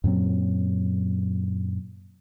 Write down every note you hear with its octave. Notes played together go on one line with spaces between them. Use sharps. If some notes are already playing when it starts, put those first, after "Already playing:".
F#2 A#2 F#3 C4